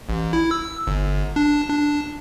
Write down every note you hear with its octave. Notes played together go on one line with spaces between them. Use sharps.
A1
E4
E6
G1
D4
D4